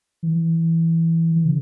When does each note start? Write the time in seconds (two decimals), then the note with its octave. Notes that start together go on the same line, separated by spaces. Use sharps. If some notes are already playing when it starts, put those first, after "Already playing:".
0.23 E3
1.36 E3
1.46 C#3